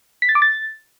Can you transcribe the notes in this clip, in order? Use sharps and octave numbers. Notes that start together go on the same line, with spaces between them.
B6
A6
D6
A6